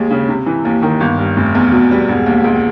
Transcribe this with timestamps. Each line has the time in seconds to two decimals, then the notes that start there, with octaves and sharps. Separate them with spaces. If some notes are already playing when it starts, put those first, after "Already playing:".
Already playing: D#2 G#3
0.10 C#3
0.29 C3
0.46 E3
0.65 D#2
0.83 D#3
1.00 G1
1.18 G2
1.37 F1
1.55 E2
1.72 B2
1.91 G3
2.09 E1
2.26 D#2
2.44 C#2